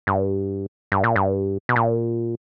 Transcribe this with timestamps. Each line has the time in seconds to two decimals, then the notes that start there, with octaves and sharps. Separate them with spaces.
0.07 G2
0.92 G2
1.04 A#2
1.16 G2
1.69 B2
1.76 A#2